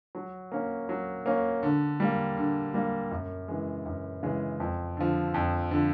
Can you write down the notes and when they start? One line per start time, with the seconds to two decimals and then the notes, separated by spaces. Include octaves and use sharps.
0.15 F#3
0.52 A#3 C#4
0.89 F#3
1.26 A#3 C#4
1.63 D3
2.00 G3 A#3
2.37 D3
2.74 G3 A#3
3.11 F#2
3.48 C#3 E3 G#3
3.86 F#2
4.23 C#3 E3 G#3
4.60 F2
4.97 D3 F3
5.34 F2
5.71 D3 F3